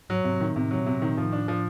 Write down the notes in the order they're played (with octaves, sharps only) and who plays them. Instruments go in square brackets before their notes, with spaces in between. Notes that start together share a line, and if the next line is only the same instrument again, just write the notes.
[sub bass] G#2 [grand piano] F#3
[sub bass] G#2 [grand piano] C3
[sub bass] A2 [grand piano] D#3
[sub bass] A2 [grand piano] C3
[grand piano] F#3
[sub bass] A#2
[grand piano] C3
[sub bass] A#2 [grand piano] D#3
[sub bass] A2 [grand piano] F3
[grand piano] D4
F3